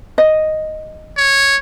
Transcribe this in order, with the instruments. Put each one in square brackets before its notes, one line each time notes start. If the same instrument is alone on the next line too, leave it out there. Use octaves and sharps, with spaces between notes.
[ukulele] D#5
[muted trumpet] C#5